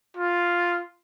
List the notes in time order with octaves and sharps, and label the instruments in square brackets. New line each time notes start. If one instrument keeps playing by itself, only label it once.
[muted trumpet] F4